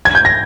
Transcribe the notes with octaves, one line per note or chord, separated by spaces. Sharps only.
G#6
G6
A#6